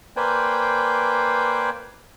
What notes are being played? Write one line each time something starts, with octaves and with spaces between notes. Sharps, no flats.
A#3 B4 C5 D5 G5 G#5